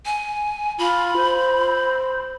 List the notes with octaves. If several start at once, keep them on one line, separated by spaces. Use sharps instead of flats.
G#5
F4 B5
C5